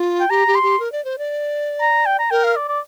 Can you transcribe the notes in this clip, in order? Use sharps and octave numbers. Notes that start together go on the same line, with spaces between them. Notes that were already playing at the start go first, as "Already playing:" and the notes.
Already playing: F4
G5
G4 A#5
G4
C6
G4
A#4
D5
C5
D5
A#5
G5
A#5
A#4 G5
F5
D5
D5